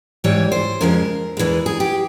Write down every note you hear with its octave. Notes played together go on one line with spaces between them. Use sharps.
G#2 E3 G3 C#5
C5
F2 C#3 F3 G#3 A#4
E2 E3 G#3
G#4
G4